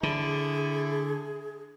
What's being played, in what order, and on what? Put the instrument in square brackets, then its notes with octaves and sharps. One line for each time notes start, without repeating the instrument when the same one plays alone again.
[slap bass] D3 [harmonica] E4 A4 [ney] G#4